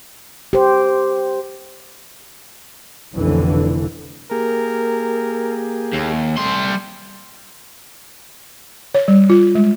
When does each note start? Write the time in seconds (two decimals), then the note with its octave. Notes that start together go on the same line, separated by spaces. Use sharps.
0.53 G4 C5
3.15 F1 B1 D3 E3
4.31 A#3 G4 G#4 A#4
5.93 D#2
6.37 G3 A3 C6
8.95 C#5
9.08 G3
9.30 F4
9.55 G#3